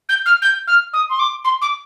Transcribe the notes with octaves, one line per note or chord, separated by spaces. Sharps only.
G6
F6
G6
F6
D#6
C6
D6
C6
D6